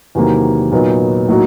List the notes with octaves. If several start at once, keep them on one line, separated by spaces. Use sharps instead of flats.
E2 C3 D#3 F#3 A#3
A#2 F#3 B3 D#4
A2 F#3 A#3 D#4 F#4